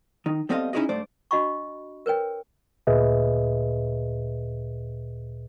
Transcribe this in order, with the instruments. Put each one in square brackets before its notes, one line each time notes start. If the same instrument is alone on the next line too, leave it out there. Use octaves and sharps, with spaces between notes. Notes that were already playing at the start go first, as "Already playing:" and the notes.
[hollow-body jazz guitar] D#3 D#4
G3 B3 C4 A4 D#5 F5
C#4 D#4 E4 F#4 G#4 D#5
G2 A3 C5 D5
[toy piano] D4 F#4 D#5 F5 B5 C#6
A#4 B4 C#5 G5
[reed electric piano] D2 A#2 G#4 B4 D#5 E5